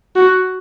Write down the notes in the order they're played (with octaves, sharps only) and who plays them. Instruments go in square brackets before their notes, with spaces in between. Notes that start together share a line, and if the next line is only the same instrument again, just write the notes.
[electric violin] F#4